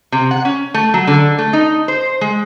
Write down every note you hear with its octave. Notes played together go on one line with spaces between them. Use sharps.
C3
F#5
C#4
A3
F#3
D3
A3
D#4
C5
G#3